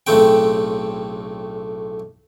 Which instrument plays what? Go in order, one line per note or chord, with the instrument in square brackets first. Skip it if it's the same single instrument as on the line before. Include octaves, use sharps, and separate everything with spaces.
[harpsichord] B1 A2 C#3 A3 C4 G5